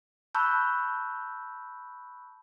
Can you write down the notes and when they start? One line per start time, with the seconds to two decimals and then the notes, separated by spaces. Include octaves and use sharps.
0.35 A5 B5 C#6 E6 F#6 G6